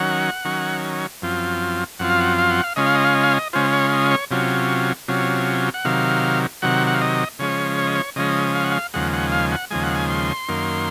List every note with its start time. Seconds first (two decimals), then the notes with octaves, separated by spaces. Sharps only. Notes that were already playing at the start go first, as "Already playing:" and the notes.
Already playing: D#3 F#3 C#4 F#5
0.45 D#3 F#3 C#4
1.22 F#2 F3 C4 F4
1.99 F#2 F3 C4 F4 F#5
2.10 F5
2.20 F#5
2.38 F5
2.51 F#5
2.64 F5
2.76 C#3 G#3 C#4 F4 D#5
2.86 F5
2.95 D#5
3.04 F5
3.15 D#5
3.24 F5
3.33 D#5
3.53 C#3 G#3 C#4 F4 C5
3.73 C#5
3.93 D#5
4.11 C#5
4.31 C3 F#3 C#4 F4
5.08 C3 F#3 C#4 F4
5.74 F#5
5.85 C3 D#3 F#3 F5
6.62 C3 D#3 F#3 F#5
6.87 F#5
6.94 F5
7.01 D#5
7.39 C#3 F3 G#3 C#4 C#5
7.78 C#5
7.87 D#5
7.96 C#5
8.16 C#3 F3 G#3 C#4 D#5
8.55 F5
8.64 F#5
8.72 F5
8.94 D#2 C#3 F3 G#3 F#5
9.13 F#5
9.32 F5
9.52 F#5
9.71 D#2 C#3 F3 G#3 G#5
9.84 F#5
9.95 G#5
10.10 C6
10.49 F#2 D#3 A#3